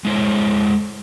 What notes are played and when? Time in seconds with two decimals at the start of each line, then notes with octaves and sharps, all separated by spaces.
0.05 G#3 E4 C5 C#5